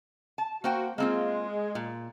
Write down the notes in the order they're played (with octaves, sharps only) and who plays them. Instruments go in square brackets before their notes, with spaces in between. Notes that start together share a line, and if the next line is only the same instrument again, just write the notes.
[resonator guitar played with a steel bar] A5
[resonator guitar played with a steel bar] A#3 C5 G5 [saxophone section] F#4
[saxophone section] G#3 [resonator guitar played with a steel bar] A#3 C4 F4
[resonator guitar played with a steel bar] A#2